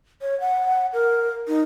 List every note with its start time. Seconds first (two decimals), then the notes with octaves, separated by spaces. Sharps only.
0.22 C#5
0.40 F#5
0.93 A#4
1.48 D#4